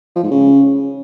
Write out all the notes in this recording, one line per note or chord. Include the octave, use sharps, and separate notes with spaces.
F3
G#2
C#3